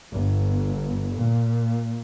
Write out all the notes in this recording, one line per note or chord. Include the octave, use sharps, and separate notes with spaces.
G1
A#2